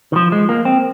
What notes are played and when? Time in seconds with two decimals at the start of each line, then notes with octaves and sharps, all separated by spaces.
0.12 D#3
0.16 F3
0.32 G#3
0.49 A#3
0.65 C4